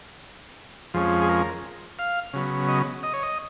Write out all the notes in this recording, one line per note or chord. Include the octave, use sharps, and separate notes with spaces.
F2 F3 G#3 C#4
G#4
A#4
F5
C#3 F#3 B3
D#5
D#5
C#5
D#5